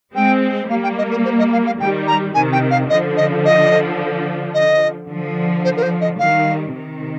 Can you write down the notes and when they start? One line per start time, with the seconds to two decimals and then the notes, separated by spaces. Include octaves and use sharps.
0.14 G#3 C4 G5
0.69 G3 A#3 F5
0.83 G5
0.98 D#5
1.11 A#4
1.25 C5
1.39 D#5
1.53 F5
1.66 F5
1.80 D#3 G3 G5
2.07 A#5
2.34 C3 D#3 G#5
2.52 G5
2.71 F5
2.90 D3 F3 D#5
3.17 D#5
3.45 D#5
4.54 D#5
5.09 D3 F3
5.65 C5
5.77 A#4
5.83 C5
6.01 D#5
6.19 D#3 G3 F5
6.74 C3 D#3